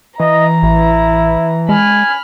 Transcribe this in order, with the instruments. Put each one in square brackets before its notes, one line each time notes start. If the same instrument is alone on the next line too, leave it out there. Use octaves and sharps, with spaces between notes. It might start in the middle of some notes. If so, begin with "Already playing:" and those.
[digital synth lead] E3 [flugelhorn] D#5 [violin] A#5
[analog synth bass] A1 [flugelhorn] E4
[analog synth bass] G#3 [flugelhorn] G#5 [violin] B5 F6